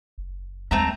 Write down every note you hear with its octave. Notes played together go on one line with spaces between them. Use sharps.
F#1
D#2 G#3 A3 C4 A#5